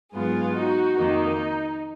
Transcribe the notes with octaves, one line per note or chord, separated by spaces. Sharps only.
G#2 F#3 B3 F4 G#4
D#4 F#4
F2 D#3 A#3 D#4